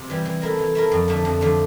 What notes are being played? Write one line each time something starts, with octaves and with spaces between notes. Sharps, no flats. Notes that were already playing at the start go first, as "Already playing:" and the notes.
Already playing: C3
E3 G3
E3
A3 E4 A#4
E3
A3 E4 A#4
F2
D3 F3 A3
F2
D3 F3 A3